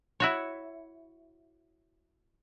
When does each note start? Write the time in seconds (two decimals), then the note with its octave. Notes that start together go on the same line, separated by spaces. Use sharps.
0.20 E4 F#4 C#5